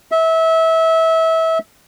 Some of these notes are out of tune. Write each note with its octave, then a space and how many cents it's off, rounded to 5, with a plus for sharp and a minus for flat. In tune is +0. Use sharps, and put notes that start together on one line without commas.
E5 -25